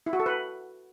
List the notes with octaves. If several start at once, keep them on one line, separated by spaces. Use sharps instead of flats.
E4
F#4
A4
B4